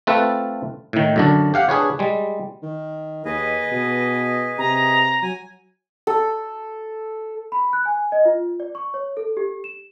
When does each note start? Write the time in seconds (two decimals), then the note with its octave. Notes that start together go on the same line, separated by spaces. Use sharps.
0.07 A3 C4 F4 A4 B4 E5
0.93 A2 D#3
1.16 F#2 D3 D4
1.54 G4 F5 F#5
1.69 D4 G#4 B4 C#5
1.99 G3 G#3
2.62 D#3
3.25 D#2 G#4 B4 D#5
3.71 B2
4.58 C3 A#5
5.22 F#3 G#5
6.07 A4
7.52 B5
7.73 F#6
7.85 G#5
8.12 D#5
8.25 F4
8.60 D5
8.75 C#6
8.94 C#5
9.17 A4
9.37 G4
9.64 E7